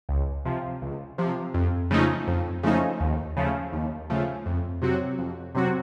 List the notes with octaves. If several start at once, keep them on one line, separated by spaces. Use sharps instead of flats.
C#2
C3 F3
C#2
C3 F3
F2
C#3 F3 A3 D#4
F2
C#3 F3 A3 D#4
D#2
C#3 F3 A3
D#2
C#3 F3 A3
F2
C3 F#3 C4 F#4
F2
C3 F#3 C4 F#4